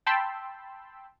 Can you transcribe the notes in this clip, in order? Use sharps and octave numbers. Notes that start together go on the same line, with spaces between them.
G5 A5 B5 C6 E6